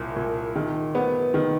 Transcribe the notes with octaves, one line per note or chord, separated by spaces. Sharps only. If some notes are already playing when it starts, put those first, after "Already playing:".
Already playing: C2 A#2
A#2
D#3
B3
D#3